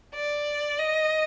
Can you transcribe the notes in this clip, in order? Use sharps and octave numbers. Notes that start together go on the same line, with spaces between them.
D5
D#5